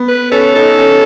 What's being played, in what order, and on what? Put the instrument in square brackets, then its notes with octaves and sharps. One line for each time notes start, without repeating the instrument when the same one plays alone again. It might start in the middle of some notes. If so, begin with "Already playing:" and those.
Already playing: [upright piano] B3
[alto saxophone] B4
[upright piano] C#4 [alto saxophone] A4
[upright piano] D#4 [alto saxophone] A4
[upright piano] C#4